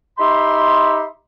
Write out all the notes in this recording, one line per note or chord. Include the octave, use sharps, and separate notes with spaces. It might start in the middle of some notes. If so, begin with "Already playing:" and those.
D#4 G4 E5 B5 C6